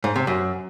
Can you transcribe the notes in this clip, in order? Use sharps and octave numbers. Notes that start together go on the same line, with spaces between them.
G#2
C3
F#2